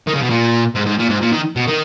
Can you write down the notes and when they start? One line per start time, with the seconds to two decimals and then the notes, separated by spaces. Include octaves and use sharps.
0.07 D#3
0.14 C#3
0.22 B2
0.30 A#2
0.75 G#2
0.86 G#2
0.99 A#2
1.09 G#2
1.22 A#2
1.33 D#3
1.56 B2
1.67 D#3